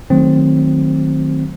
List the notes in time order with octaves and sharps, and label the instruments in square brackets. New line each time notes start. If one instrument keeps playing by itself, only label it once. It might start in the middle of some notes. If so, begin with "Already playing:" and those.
[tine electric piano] D#3 F#3 A3 C4